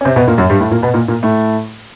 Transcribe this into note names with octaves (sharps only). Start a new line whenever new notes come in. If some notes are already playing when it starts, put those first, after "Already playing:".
C#4
C3 C4
B2 B3
A#2 A#3
F#2 F#3
G2 G3
A2 A3
A#2 A#3
B2 B3
A#2 A#3
A#2 A#3
A2 A3